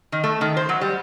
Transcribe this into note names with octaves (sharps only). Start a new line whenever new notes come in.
D#3
A3
D#3
C5
F#3
G3